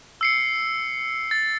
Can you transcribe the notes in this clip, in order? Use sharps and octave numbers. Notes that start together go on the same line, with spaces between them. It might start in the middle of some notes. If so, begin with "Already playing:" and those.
E6 C7 C#7
A6